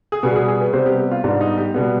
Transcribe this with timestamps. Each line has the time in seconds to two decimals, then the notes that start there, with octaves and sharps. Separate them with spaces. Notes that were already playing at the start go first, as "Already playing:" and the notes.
0.12 G#4
0.23 B2 G3 B3 B4
0.36 G#4
0.48 G#4
0.61 B4
0.73 C3 G3 B3 C5
0.86 G4
0.99 G4
1.11 F4
1.24 G#2 G3 B3 D4
1.41 D#4
1.58 G4
1.74 B2 G3 B3